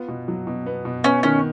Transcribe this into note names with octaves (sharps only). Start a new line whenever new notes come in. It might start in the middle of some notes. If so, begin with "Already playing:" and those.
Already playing: B3 F4
B2
F#3
B2
B3
B2
B3 C#4
D#3 C#4